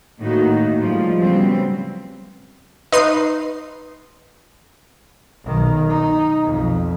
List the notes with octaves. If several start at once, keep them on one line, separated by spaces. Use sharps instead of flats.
A2 D#3 A3 A#3 D#4 F#4
A2 F3 G3 G#3 F4
C#3 F#3 G3 B3 C4
D#4 B4 C6 C7 D#7
B1 D#3
D#4
B1 F2